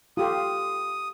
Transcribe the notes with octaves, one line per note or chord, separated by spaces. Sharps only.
F4 G4 A4 D#6